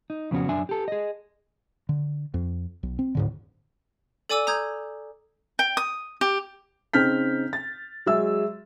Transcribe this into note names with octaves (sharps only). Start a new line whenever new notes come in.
D#4
F2 C#3 B3 C#4 F#4
F#2 D4 E5 G#5
G4 A4
G#4 D#5
D3
F2
B1
C4
D1 G#2 D3
A4 D5 G#5 D6 E6 D#7
A#5 D#6 G6 G#6
G5
D#6
G4
C#3 C4 D#4 F6 G6 B6
A6
F#3 G#3 G#4 E5 E6